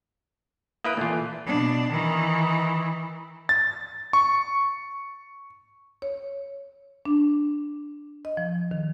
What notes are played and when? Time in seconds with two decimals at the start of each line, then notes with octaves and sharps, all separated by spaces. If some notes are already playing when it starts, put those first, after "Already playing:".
0.84 A#3 E4 B4 D#6 F#6 D7
0.97 A#2 E3 A3 F4
1.46 B2 D4
1.90 D#3 E3
3.49 A6
4.13 C#6
6.02 C#5
7.05 D4
8.25 D#5
8.37 F3
8.71 D#3